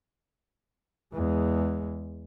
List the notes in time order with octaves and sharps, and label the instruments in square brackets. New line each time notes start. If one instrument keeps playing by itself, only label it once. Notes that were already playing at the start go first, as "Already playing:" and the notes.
[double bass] E2 G#3